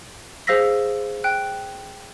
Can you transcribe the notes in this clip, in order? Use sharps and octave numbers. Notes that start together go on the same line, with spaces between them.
G#4 C5 F5 E6 A#6 B6
G5 F#6